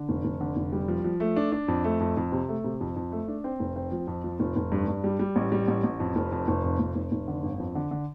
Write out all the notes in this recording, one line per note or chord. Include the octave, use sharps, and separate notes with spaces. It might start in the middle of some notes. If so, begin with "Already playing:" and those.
Already playing: D3
F1
F1
D3
F1
G3
F3
F3
A3
D4
D4
F2
A3
F2
F2
C3
A3
C3
F2
F2
A3
D4
C4
F1
C4
F3
F2
F3
F1
F1
G2
G2
G3
G3
A1
G3
A1
A1
F2
F1
F2
F1
F2
F1
F1
F1
D3
G1
F2
D3
D3